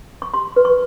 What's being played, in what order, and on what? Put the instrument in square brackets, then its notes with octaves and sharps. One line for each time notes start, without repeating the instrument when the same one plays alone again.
[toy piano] C#6
G4 C6
B4
C#6